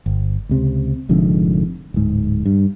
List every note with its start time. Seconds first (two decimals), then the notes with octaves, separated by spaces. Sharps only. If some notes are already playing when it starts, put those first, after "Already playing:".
0.06 G1
0.49 C#2 C3
1.09 F1 F2 G#2 D3
1.94 D1 G#2
2.46 G2